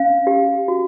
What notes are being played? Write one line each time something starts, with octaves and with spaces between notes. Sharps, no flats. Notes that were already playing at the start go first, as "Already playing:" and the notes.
Already playing: C#4 F5
G4
F#4